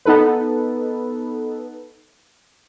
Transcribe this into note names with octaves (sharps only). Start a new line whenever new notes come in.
B3 D#4 A4 B4